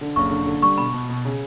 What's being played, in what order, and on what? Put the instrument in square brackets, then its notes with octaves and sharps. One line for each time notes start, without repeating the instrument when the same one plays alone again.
[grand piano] D3
[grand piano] F#1 [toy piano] C#6
[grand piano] D3
D3
[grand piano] G3 [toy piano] C#6
[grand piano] B2 [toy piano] B5
[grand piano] B2
B2
C#3